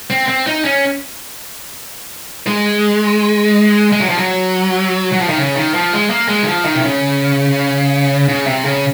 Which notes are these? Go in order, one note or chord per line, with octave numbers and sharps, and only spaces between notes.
C4
C4
D#4
C#4
G#3
G#3
F#3
F3
F#3
F#3
F3
D#3
C#3
D#3
F3
G#3
A#3
G#3
D#3
F3
D#3
C3
C#3
C#3
C3
C#3